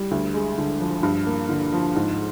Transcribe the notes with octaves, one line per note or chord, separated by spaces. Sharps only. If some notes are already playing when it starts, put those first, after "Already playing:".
Already playing: G3
D2
G#3
D3
F3
G2
A#3
D3
F3
G#2